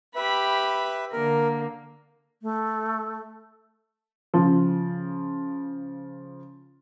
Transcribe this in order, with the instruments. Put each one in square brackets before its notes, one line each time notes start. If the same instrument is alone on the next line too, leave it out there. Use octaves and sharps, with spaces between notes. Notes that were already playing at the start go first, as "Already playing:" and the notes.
[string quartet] G4 B5 [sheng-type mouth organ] B4 E5
[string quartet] D3 A#3 [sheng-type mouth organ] A#4
[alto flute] A3
[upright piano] C#3 F3